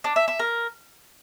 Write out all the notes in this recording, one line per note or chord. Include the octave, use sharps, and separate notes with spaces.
D4
E5
E5
A#4